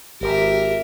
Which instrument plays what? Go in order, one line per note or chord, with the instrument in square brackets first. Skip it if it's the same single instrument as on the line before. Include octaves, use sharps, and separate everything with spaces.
[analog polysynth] G#1 [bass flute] G4 [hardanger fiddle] A#4 E5